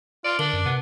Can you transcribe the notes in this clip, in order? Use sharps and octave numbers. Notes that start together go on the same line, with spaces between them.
F4 D5
D3 D4 A#4 F#7
F#2
C3 B3